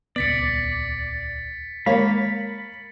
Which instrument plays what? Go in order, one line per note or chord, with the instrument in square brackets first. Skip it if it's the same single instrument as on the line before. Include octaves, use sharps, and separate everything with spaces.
[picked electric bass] D#1 C#2 B3 [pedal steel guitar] D5 [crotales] A6 B6 C#7
[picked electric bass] G#3 [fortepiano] A#3 C#5 F5 [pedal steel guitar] B5